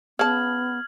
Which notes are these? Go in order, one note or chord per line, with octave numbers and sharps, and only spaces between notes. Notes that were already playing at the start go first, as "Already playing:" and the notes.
C#3 B3 A5 F6 G#6 F#7